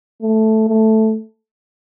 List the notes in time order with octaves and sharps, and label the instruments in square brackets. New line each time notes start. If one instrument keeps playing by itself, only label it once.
[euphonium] A3
A3